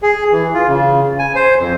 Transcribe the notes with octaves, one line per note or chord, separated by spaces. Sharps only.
G#4
E3
F4
C#3
G#5
C5
F2